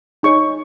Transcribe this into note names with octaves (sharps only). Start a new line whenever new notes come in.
D#4 G#4 C#5 C#6